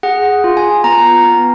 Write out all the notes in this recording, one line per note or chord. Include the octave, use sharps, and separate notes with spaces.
G#4 F#5
F4
G#5
B3 A#5
B3